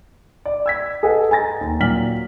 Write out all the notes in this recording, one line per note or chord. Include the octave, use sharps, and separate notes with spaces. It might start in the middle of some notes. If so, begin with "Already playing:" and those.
D5
E6 G#6 B6
G#4 A4 B4 D#5 F#5
G#5 A#5 A6 A#6
D#2
A#2 F#3 F6 B6 F#7